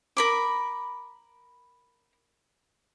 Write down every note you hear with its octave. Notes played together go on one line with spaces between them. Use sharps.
A#4 B5 D6